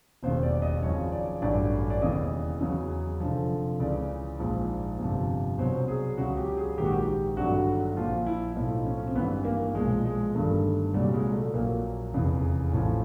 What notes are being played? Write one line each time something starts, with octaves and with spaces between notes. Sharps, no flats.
E1 D#2 C#3 C5
D5
D#5
G#1 F#2 C#3 F3 C#5
D5
A1 G2 D3 F#3 D5
D5
E1 D#2 C#3 E3 D#5
E2 C#3 F#3
F1 F2 D3 F3
C#2 C#3 E3 D5
A#1 G#2 F3
G1 F2 C3 F3
C2 B2 F#3 C5
G#4
C#2 C#3 F#3 F#4
G4
G#4
A#1 G#2 D#3 G4
F#4
G4
G#1 G2 D3 F#3 F#4
A#1 A#2 F3 F4
E4
B1 A2 F3 D#4
C#4
C#4
C4
G#1 G2 E3 B3
A#3
B1 A#2 F3 G#3
G#3
G1 G2 D#3 A3
C2 A#2 F#3 G3
G#3
A3
A#1 A#2 F#3 A#3
F1 E2 C#3 E3
A1 A2 F3